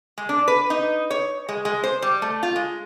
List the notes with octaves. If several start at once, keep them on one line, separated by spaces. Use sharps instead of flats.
G#3
D4
B4
D#4
C#5
G#3
G#3
C5
G3
A3
F4
G#3